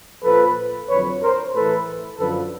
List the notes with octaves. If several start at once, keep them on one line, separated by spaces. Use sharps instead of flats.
A#2 F3 A4 B4
F2 D3 F#3 B4 C#5
A#4 C5
A2 E3 A4 B4
F#2 D3 F3 A4 B4